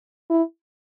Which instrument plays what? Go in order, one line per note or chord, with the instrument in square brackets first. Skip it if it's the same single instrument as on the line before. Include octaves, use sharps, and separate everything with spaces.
[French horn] E4